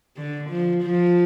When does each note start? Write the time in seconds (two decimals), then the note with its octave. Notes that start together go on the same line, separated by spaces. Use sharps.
0.17 D3
0.50 F3
0.83 F3